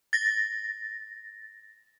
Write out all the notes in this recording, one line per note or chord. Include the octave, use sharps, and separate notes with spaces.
A6 A#6